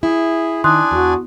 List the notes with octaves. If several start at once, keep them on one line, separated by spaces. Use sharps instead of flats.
E4 G#4
D#3 D4 D5 G#5 C6 D#6 F#6
E2 F#4